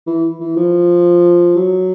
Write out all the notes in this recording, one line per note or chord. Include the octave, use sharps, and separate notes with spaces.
E3
E3
F3
F#3